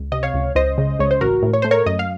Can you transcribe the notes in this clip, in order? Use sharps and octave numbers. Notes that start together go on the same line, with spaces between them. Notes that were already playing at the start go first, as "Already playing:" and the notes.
Already playing: C#2
C3 D#5
C#5 F5
C#2
C#2 C5 D#5
C#3
C#2 C#5
C5
A1 F#4 A#4
A2
C#5
A3 C5
A#4 C#5
F#2 D#5
F5